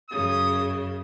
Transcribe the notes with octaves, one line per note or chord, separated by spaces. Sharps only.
F#2 C#3 D#6